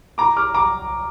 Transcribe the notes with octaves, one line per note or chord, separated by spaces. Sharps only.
A#5 D6
D6 F6
A#5 D6